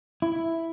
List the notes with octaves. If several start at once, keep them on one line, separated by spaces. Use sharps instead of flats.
E4